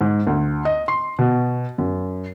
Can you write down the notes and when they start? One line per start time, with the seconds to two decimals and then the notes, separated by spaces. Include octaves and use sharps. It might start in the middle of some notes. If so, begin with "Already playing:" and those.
0.01 G#2
0.27 D2
0.65 D#5
0.88 C6
1.19 B2
1.78 F#2